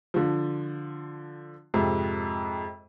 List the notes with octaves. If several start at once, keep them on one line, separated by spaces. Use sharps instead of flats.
D3 F3
F2 G#2 C3